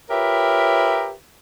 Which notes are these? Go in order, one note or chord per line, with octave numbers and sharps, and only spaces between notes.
F4 G4 A#4 B4 C#5 E5